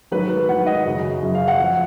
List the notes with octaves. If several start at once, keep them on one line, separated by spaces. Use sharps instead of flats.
G#2 D#3 F#3 B4
G#2 D#3 F#3 F#5
D#5
F#2 C#3 F#3
F#2 C#3 F#3
F5
F#5
F3